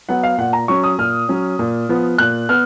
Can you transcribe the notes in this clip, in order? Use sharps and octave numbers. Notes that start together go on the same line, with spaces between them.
F#3 B3 F#5
F5
A#2 F#5
A#5
F#3 C#4 C#6
D#6
A#2 F6
F#3 C#4
A#2
F3 B3
A#2 F#6
B3 F6